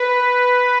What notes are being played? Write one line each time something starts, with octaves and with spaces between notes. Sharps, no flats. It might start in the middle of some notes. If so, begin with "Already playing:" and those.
Already playing: B4